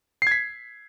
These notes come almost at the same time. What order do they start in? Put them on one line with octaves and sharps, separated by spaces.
C7 G#6 B6